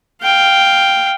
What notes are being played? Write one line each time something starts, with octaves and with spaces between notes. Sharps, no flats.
F5 G5